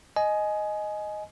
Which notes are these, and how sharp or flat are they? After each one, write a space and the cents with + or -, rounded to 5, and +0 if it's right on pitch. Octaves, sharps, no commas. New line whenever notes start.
D#5 +0 G#5 +20